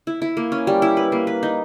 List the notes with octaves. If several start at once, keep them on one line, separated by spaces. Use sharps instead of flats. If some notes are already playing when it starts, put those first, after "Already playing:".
E4
E4
A#3
C#4
G3
E4
B4
A#3
B4
D#4